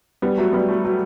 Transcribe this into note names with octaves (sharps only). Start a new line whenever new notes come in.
G3 B3
F#3 A3
G3 B3
F#3 A3
F#3 A3